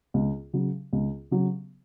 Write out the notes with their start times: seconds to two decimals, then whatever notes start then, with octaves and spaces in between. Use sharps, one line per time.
0.14 C#2
0.53 C#3 F#3
0.93 C#2
1.31 C#3 F#3